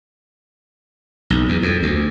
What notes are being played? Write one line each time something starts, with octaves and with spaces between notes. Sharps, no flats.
B1
E2
F2
D2